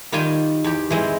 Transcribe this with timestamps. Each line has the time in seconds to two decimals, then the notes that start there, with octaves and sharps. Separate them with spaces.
0.12 D#3 G3 F4 G5 G#5
0.64 E2 G4
0.90 E3 G#3 C4